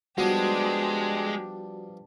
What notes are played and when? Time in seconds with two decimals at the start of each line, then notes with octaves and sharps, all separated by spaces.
0.18 F3 G3 G#3 B3 D4 F#4 G4